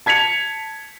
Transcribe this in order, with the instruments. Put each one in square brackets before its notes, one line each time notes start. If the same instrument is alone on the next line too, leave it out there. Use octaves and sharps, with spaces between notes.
[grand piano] A5 G#6 B6 C#7 F7